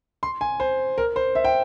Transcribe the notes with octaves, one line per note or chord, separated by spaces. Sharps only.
C6
G#5
C5
A#4
C5
E5
G5